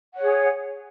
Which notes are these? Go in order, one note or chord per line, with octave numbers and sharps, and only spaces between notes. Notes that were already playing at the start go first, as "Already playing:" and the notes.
G#4 C#5 F#5